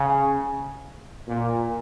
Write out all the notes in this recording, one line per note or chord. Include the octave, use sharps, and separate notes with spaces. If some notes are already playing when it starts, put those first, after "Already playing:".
Already playing: C#3
A#2